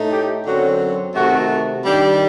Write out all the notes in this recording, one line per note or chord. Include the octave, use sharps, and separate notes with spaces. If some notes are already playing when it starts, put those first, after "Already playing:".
Already playing: A2 A3 D#4
G4
F#2 D3 F#3 C4 F#4
C3 D#3 A3 F#4
D#3 G3 D4 G4